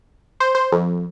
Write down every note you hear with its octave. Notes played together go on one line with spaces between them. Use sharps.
C5
C5
F2